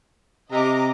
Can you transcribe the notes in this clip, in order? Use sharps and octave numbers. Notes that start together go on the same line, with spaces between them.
C3 D#5 A#5 D6